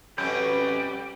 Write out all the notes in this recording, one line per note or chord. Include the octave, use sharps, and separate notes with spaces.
F2 B2 G3 B3 C#4 A4 B5 G6